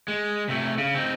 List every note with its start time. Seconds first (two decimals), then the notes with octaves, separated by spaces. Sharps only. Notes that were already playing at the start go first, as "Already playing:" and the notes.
0.08 G#3
0.49 C3 A3
0.78 C#3
0.95 C4 D#4